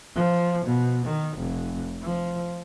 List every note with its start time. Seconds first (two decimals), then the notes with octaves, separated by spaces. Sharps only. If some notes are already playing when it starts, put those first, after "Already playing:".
0.15 F3
0.65 B2
1.06 D#3
1.38 F1
2.02 F3